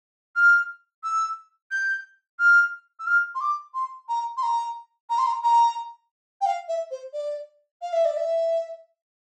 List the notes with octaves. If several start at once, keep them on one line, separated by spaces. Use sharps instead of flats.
F6
E6
G6
F6
E6
F6
C6
D6
C6
A#5
C6
A#5
A#5
C6
A#5
A#5
G5
F5
E5
C5
D5
F5
E5
D5
E5